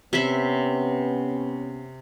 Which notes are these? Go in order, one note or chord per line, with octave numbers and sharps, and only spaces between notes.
C3 B3 C#4 E5 B5